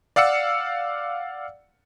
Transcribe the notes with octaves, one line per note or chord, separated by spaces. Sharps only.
D5 F5 F#5 E6 C#7